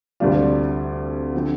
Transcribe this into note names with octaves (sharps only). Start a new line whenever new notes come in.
D2 C3 G3 D4 F4
D3 F3 C4